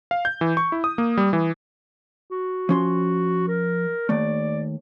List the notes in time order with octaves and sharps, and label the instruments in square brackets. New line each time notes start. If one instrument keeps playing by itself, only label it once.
[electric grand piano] F5
G6
E3
C#6
E4
D#6
A#3
G3
E3
[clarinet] F#4
[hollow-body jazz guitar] F3 C#4 C6
[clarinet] A#4
[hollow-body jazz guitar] D#2 A3 [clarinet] D5